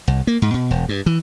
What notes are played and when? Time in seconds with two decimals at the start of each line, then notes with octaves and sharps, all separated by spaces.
0.08 C2
0.27 A#3
0.42 G#2
0.54 B2
0.71 E1
0.89 G2
1.06 E3